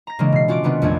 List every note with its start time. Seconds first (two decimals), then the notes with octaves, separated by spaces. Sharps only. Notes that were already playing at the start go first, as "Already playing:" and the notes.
0.07 A#5 A#6
0.19 C#3 E3 G#3 A#3 D4
0.32 B2 C7
0.48 C#4 F4 F#4 D6 D7
0.64 C3 D#3 B3 C#4 D4
0.82 A#1 F2 A3 D4 G#6